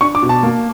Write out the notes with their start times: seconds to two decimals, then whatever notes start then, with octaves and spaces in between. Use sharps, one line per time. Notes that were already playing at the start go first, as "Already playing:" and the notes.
0.01 D4 C#6
0.15 D6
0.23 B2
0.29 A5
0.43 A#3